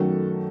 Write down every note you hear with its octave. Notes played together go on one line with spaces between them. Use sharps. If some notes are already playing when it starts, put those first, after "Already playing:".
Already playing: F#2 D#3 F#3 A3 F#4 A4